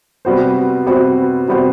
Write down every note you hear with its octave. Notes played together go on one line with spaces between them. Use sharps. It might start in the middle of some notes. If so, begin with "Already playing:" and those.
C3 G3 B3 F#4 C5
C3 G3 B3 F#4 C5
C3 G3 B3 F#4 C5